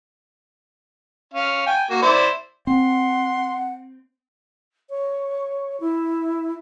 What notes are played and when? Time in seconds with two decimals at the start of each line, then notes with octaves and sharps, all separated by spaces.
1.34 C#4 F5
1.67 G5 G#5
1.90 A#3 F#4
2.02 E4 C5 D5
2.67 C4 F#5 C6
4.90 C#5
5.80 E4